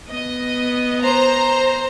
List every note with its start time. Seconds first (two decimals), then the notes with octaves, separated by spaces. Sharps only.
0.11 B3 D#5
1.02 C5 A#5